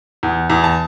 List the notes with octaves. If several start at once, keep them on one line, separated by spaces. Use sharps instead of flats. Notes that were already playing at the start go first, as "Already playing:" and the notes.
E2
E2
A5